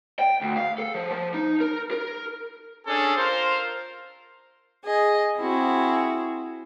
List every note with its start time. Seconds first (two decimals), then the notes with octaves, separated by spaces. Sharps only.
0.19 G5
0.41 D2
0.57 F5
0.78 A4
0.95 F3
1.11 F3
1.34 D#4
1.60 A#4
1.91 A#4
2.86 C#4 D4 G#4 A4
3.17 F4 A#4 C5
4.82 G#4 D#5
5.38 C4 E4 F#4 G#4